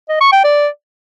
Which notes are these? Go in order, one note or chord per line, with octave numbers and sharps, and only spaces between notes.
D#5
C#6
G5
D5